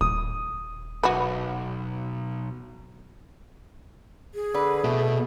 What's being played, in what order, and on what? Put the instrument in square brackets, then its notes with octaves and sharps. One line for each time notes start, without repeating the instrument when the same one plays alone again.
[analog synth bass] D#1 [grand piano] D#6
[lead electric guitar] B1 [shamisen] F#4 B4
[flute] G#4
[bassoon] D3 [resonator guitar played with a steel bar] B4
[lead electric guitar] B2 [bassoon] A3